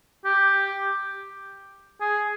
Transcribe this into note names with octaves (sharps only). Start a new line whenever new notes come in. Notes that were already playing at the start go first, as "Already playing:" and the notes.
G4
G#4